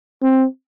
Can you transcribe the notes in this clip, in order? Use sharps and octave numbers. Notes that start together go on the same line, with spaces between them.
C4